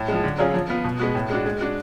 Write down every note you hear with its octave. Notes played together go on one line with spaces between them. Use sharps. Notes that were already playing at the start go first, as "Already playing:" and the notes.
Already playing: A2
F3 G#3
D3
F#3 C#4 F4 G#4
F3
B3 F4
B2
G#3 B3 F#4
A2
G#3 D4 F#4
G#3
D4 F#4